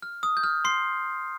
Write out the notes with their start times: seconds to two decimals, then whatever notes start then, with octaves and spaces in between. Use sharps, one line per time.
0.02 F6
0.23 D#6
0.37 G6
0.43 F6
0.65 C6 C7